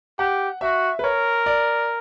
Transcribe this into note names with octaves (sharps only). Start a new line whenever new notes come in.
G4 F#5
F#4 E5
B4
A#4 C#5
D5